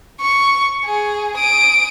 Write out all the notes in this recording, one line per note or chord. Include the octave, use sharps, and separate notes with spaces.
C#6
G#4
D#6 D7